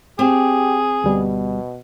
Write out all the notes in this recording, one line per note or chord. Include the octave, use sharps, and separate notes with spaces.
C4 G4 G#4
D2 B2 G3 B3